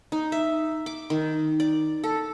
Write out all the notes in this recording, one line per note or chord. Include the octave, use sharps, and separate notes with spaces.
D#4
E5
D6
D#3
D5
A4